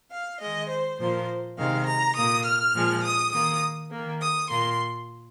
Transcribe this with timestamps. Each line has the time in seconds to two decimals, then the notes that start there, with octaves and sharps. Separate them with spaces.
0.11 F5
0.41 D#3 G#3 D#5
0.70 C5
0.99 A#2 F3 A#3 C5
1.57 C3 D#3 G#3 F5
1.87 A#5
2.16 A#2 A#3 D#6
2.45 F6
2.74 A#2 F3 G#3
3.03 D#6
3.32 D#3 A#3 D#6
3.90 D#3 A#3
4.20 D#6
4.49 A#2 A#3 C6